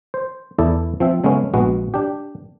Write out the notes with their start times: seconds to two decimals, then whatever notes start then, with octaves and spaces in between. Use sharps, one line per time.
0.14 C5
0.58 E2 E4 A4 D5
1.00 F3 C4 E5
1.24 C#3 G#3 A3 B3 C#4
1.54 A#1 G#3 B3 F#4
1.94 D4 G4